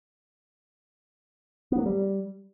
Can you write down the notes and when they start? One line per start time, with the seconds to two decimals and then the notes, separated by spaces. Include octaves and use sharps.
1.72 B3
1.79 A#3
1.86 G3